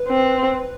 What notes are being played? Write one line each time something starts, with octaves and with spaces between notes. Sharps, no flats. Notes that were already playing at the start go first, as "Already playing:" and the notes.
Already playing: B4
C4